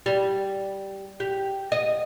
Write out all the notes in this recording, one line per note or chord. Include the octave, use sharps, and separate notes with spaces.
G3
G4
D#5